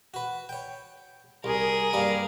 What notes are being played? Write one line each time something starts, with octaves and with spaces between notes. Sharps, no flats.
F#4 B4
C#5 G5
C2 G#4 A#4
G2 G3 A#3